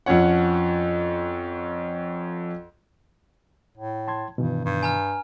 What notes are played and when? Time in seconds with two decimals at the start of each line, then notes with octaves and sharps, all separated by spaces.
0.06 F2 F3 C#4 C#5 F#5
3.78 A2
4.07 A5 C6 G#6
4.38 G2 B2 D#3 E3
4.65 G2
4.83 G#5 A#5 F6